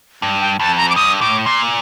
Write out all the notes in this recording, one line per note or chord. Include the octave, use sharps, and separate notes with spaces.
G2
G5
F2 A5
A#5
D6
G2 D#6
A2 D6
A#2 C6